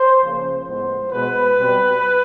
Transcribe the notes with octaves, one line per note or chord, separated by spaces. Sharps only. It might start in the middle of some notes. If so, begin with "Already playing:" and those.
Already playing: C5
C#3 F3 A#3
A2 F3 G#3 B3 C5
B2 G#3 B3 B4
B2 G3 C4